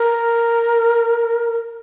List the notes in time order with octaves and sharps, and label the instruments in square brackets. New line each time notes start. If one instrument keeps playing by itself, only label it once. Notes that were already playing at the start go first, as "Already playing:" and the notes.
Already playing: [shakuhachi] A#4